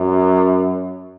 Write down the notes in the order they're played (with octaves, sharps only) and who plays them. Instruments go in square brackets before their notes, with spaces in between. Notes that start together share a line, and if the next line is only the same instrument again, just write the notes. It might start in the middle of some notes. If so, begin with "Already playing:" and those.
Already playing: [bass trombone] F#2